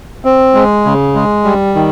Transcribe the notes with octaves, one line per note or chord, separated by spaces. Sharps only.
C4
G#3
C#3
G#3
G3
D#3